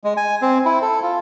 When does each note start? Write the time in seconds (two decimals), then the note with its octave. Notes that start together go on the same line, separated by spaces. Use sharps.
0.04 G#3
0.17 G#5
0.42 C4
0.65 E4
0.82 A4
1.02 F4